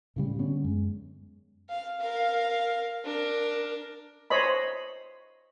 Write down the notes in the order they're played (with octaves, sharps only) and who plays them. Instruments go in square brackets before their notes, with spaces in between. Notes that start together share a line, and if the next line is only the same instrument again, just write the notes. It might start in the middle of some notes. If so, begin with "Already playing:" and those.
[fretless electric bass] A2 C#3 G3
D3 B3 C#4
F#2 G#3
[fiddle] F5
A#4 F5
D4 A#4
[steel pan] C5 C#5 D#5 B5